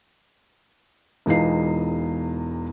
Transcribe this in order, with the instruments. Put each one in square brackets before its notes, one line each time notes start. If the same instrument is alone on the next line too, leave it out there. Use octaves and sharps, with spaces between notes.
[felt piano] E1 E2 G#3 D#4 F4 C7